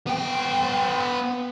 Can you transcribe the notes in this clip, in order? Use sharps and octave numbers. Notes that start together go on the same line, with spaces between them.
B3 G5